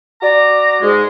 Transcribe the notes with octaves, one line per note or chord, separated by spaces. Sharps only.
F#4 D5 A#5
G#2 G#3